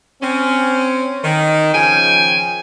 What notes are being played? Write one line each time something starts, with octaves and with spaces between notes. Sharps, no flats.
C4 C#4
D#3
C#3 F3 G5 G#5